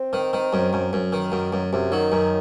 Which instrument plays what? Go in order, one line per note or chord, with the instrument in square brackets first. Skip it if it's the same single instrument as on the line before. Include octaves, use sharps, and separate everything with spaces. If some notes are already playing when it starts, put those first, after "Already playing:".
Already playing: [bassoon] C4
[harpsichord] D#3
D#3
F#2
F#2
F#2
D#3
F#2
F#2
[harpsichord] F#2 [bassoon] C3
[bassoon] D#3 [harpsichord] F#3
[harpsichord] F#2